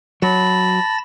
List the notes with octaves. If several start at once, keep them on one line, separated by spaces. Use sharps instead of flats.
F#3 A5 B5 A6 A#6